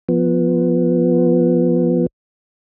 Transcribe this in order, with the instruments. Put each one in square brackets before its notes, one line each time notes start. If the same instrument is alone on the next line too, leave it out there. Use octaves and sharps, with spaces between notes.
[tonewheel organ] F3 B3